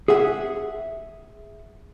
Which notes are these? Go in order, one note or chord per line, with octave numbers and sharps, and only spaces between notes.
G#4 E5 F#5